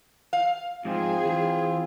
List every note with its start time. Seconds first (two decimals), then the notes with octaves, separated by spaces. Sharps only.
0.33 F5
0.85 G#2 F3 C4 D#4 F4 G#4
1.26 E3